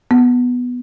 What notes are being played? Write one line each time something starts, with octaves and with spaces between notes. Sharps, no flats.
B3